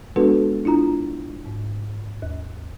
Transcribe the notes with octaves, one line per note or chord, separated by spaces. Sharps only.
G#3 B3 D4 F#4 A4 B4
D4 E4 F4 A#5
G#2
D#2